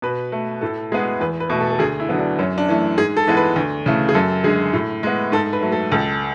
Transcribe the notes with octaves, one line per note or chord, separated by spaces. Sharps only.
B2 B4
A3
A2 A4
G#3 B3 G#4
E2 B4
B4
B2 A3
A4
A4
D2 G#4
E4
D3 F#3 B3
D4
F#2 C#4
D4
E3 A3
G#2 G#4
A4
E3 G#3 B3
B4
D2
C#3 E3 A3
G#4
F#2 A4
D3 G#3 G#4
A2
G#3 B3
G#2 A4
B4
F#3 A3
A4
C#2 A4